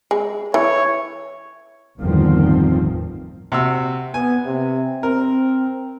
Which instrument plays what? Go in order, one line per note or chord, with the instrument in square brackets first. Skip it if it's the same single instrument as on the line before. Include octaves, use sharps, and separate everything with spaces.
[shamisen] G#3
[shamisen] E3 [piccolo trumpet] C#5
[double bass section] G1 E2 A2 D#3 F3 C4
[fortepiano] C3 F#4 E6
[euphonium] B3 [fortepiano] G#5
[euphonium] C3
[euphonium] C4 [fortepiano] A#4